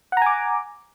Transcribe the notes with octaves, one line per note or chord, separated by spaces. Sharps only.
F#5 G#5 A#5 D6